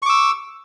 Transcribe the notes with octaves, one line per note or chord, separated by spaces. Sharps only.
C#6 D6 E6